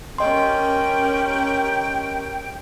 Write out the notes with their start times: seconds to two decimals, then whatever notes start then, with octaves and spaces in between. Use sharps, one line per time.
0.18 C#4 G4 A#4 D#5 G5 C6